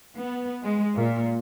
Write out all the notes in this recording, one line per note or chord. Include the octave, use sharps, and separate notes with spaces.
B3
G#3
A#2